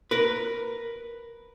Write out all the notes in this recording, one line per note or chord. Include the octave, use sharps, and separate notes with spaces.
A#4 B4